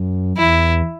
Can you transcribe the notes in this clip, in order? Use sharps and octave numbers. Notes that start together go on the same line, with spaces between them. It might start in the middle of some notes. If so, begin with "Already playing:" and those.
Already playing: F#2
E2 E4